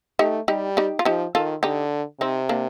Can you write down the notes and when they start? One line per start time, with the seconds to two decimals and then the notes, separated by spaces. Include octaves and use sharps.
0.19 A3 D#4 G4
0.48 G3 D#4 G4
0.77 D#4 G4
0.99 F4
1.05 F3 D#4 G4
1.35 D#3 F4 A4
1.63 D3 D#4 G4
2.21 C3 C4 D#4
2.49 A#3 D4